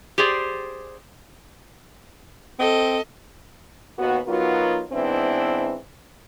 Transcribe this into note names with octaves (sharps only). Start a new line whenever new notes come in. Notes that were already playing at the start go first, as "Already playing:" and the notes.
G4 G#4 C5 D5
C4 A4 D#5
D#2 B3 F#4
F#3 B3 D#4 F4 F#4 A#4
G#2 E3 B3 C4 D4 E4